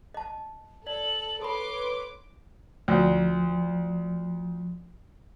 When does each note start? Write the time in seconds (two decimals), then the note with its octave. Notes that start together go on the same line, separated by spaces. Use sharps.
0.14 D#5 A5
0.87 A4 D5 F#7
1.41 A4 B4 C#5 B5 C6 D6
2.88 D2 F3